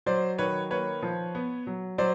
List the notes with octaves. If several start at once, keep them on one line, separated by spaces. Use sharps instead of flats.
F#3 C5 D5
D#3 B4 C#5
A#3 B4 C#5
F3
B3
F#3
F#3 C5 D5